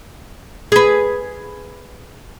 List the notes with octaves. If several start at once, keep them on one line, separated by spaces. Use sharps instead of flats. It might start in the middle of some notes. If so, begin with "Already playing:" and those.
G#4 B4